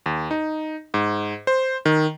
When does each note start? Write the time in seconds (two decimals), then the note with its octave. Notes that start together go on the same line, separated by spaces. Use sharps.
0.06 D#2
0.31 D#4
0.94 G#2
1.47 C5
1.86 D#3